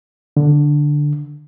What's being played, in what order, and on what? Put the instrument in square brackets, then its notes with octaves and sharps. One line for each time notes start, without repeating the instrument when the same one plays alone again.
[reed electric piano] D3